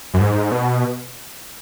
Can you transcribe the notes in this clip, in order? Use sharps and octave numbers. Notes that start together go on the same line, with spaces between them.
F#2
G#2
B2